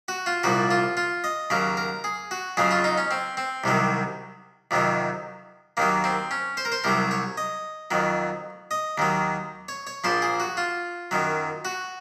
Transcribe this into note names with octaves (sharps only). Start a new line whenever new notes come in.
F#4
F4
C2 A#2 F3 F#4
F4
F4
D#5
D#2 C#3 F#3 A#4
A#4
G#4
F#4
F2 C#3 F#3 G#4
F4
D#4
C#4
C4
C4
C2 C3 D#3 F#3
F2 C3 D#3 F#3
D#2 D#3 F#3 A#3
C4
C#4
C5
A#4
C5
C2 C3 F#3 A#4
C#5
D#5
F2 D#3 F#3
D#5
D#2 D#3 F#3
C#5
C#5
A#1 A#2 F3 C5
G#4
F#4
F4
F#2 D#3 F#3
F#4